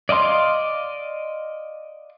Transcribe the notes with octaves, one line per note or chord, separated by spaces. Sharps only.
D5 D#5 F5 C6 D6